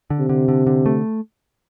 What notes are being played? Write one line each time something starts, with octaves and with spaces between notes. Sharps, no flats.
D3
C3
D3
D3
D3
A3